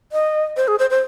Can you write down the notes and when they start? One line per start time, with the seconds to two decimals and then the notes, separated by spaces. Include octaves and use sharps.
0.12 D#5
0.57 C5
0.68 G#4
0.79 C5
0.90 C5